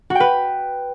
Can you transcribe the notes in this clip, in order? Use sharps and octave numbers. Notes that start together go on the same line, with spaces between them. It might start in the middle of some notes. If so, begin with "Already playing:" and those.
F#4
G5
B4